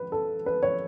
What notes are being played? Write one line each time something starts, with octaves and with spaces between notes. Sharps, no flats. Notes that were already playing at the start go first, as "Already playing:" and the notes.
Already playing: B4
A4
B4
C#5